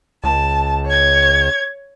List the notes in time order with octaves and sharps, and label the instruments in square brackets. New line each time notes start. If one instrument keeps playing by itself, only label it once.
[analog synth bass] C#2 [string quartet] A5
[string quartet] C#5 G#6